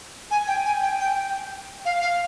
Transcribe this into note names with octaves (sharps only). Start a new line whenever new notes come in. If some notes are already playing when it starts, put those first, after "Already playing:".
G#5
G5
G#5
G5
G5
F5
F5